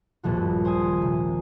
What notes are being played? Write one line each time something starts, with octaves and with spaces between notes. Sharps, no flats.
D#1 A#1 G2 F3 F#4
C5 G#5 D#6
C3